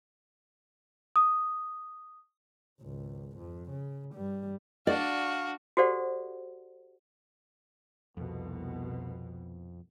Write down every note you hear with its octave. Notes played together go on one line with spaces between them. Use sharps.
D#6
G#1 C#2
F2
C#3
G2 G3
D4 F#4 D5 F5
F#4 G4 A4 C5 D5 F#5
C2 F2 B2